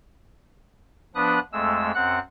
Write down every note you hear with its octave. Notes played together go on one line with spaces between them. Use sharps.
F3 B3 D4 B4 D#6 F#6
F2 G#3 A3 E6
F#2 C4 F#5 F#6